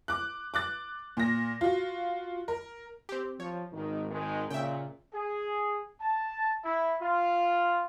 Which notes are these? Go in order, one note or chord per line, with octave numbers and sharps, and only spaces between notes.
D6 F#6
D6 F#6 A6
A#2 A#6
F4 F#4
A#4
C4 G4
F3 C#5
G#1 D#3
D#3 G#3
A#2 C#3 E5 G5
G#4
A5
E4
F4